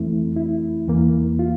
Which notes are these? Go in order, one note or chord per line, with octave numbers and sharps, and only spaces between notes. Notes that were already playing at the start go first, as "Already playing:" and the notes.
Already playing: F2 E3 A3 C4 E4
E4
E2 E3 A#3
F4